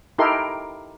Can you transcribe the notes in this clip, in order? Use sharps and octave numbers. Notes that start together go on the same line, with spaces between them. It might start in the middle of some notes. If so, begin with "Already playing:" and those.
D#4 E4 G4 A4 A#4 C6